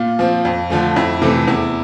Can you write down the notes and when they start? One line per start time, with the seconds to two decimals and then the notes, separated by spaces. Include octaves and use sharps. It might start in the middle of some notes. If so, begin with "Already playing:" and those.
Already playing: A#2 F4
0.19 F3 C4
0.45 F2
0.70 D3 F3 A3
0.96 F2 E4
1.22 C3 E3 A3 C4
1.47 E2 E4